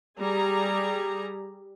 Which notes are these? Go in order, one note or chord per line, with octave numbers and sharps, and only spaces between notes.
G3 G#4 A#5